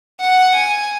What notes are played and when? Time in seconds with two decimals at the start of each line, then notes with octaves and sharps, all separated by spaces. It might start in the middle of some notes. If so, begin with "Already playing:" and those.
0.21 F#5
0.55 G#5